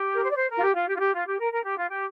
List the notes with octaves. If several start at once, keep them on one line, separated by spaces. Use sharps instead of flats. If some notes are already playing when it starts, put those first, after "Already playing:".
Already playing: G4
A#4
C5
D5
C5
A#4
F4
G4
F4
G4
F4
G4
F4
G4
A#4
A#4
G4
F4
G4